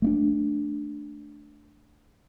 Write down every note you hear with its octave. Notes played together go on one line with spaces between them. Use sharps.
A3 A#3 D4